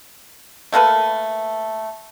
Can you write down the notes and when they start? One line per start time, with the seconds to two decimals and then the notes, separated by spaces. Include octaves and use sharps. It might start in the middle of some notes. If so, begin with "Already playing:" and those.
0.73 A3 A#3 A4 B4